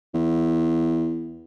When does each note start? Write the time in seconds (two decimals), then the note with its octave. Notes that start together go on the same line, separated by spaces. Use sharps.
0.14 E2